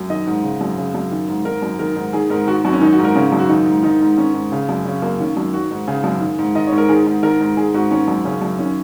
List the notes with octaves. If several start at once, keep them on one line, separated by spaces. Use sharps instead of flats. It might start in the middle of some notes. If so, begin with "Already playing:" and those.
Already playing: F#2
D#3 D#5
G#2
C#3
F#2
C#3
F#2
D#3
G#2
D#3 A#4
F#2
D#3 A#4
G#2
D#3 G#4
G#2 A#4
D#3 F#4
F#2 F#4
C#4
D#3 D#4
F#4
G#2
A#4
C#3 C#4
F#2
F#4
D#3 D#4
G#2
D#3 D#4
G#2
D#3 C#4
G#2
C#3
F#2
C#3 C#4
F#2 A#3
D#3 C#4
F#2
D#3 F#4
G#2
C#3 G#4
F#2
D#3
G#2
D#3 D#5
C#5
G#2
A#4
D#3 G#4
G#2
D#3 A#4
G#2
D#3 G#4
G#2 F#4
D#3 C#4
F#2
C#3 C#4
F#2
D#3 C#4